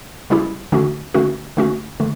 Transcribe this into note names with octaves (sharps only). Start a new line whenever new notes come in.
C#3 G3 C#4 E4 G4
D3 A3 C#4 F#4
D3 A3 C#4 F#4
D3 A3 C#4 F#4
D3 A3